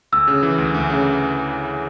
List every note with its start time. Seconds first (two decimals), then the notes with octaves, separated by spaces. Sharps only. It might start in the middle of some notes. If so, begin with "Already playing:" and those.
0.12 D2 E6
0.27 C#3
0.43 E3
0.58 D2
0.74 D2
0.90 C#3